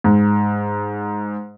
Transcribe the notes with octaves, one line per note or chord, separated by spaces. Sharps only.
G#2